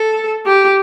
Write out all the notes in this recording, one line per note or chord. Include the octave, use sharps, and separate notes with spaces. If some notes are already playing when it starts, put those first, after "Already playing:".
Already playing: A4
G4